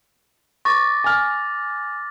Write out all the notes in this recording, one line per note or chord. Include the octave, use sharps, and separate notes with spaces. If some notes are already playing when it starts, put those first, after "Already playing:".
C#6 D6 A6 A#6
G#5 F6